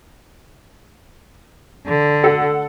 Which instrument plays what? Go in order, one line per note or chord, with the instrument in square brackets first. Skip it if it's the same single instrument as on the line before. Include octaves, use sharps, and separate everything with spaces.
[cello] D3
[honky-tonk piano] A4 F#5